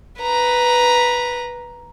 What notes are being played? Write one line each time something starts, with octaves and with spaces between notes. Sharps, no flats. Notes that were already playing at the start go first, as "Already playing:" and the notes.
B4 A#5